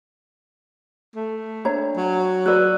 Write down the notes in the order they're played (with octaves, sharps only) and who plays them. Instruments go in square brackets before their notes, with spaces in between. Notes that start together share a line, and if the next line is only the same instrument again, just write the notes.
[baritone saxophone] A3
[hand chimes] D4 [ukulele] C#5 A#5
[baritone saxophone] F#3
[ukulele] F#4 B4 [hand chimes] D5 E6 F#6